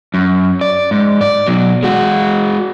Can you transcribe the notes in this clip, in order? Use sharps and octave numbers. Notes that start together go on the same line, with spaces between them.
F#2
D5
G#2
D5
B2 F#3
G#3 F#4